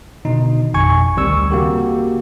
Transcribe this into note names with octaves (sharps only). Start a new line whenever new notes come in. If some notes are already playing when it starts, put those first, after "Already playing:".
B2 D3 D#3 D#4
A1 F2 B2 G#5 C#6 G#6
D2 D#3 G3 C4 C#6 E6
C#3 A#3 F#4 G4 A#4